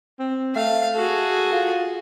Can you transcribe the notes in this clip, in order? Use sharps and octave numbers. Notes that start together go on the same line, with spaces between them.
C4
A3 F5
F#4 G#4 A4
F4